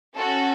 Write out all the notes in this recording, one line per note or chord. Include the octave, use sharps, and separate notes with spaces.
C#4 F#4 A4